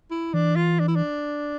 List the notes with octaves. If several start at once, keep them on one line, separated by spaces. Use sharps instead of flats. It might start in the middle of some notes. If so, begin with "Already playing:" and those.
E4
E3 D4
F4
D4
E4
D4